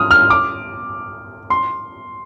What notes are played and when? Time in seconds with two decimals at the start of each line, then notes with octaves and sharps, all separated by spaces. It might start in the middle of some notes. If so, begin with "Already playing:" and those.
Already playing: D#6 F6
0.11 F6
0.30 D6
1.50 C6